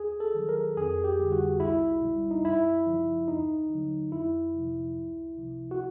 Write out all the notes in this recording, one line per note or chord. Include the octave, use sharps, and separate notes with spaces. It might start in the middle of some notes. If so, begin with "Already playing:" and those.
Already playing: D#2 G#4
A4
D#3 F#3
A#4
F2 G#4
G4
D3 G3
F#4
C2 E4
B2 G3
D#4
F#2 E4
C#3 F3
D#2 D#4
D3 F#3
F2 E4
C3 F3
C#2
C3 F3
F#4